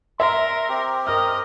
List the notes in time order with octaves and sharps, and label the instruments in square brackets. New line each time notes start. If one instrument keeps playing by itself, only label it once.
[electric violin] A#4 [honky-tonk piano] E5 [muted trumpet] C6
[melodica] C4 G4
[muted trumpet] A#4 [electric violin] D#5 [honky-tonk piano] F6